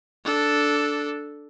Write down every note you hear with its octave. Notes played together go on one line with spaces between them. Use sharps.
D4 A4